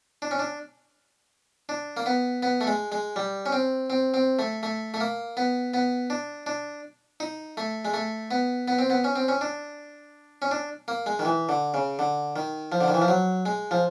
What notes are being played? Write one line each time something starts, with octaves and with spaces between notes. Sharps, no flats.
D4
C#4
D4
D4
A#3
B3
B3
A3
G#3
G#3
G3
C#4
C4
C4
C4
A3
A3
A3
A#3
B3
B3
D4
D4
D#4
A3
G#3
A3
B3
B3
C4
B3
C#4
C4
C#4
D4
C#4
D4
A#3
G#3
D#3
E3
D3
C#3
D3
D#3
F3
D3
D#3
E3
F3
F#3
G#3
F3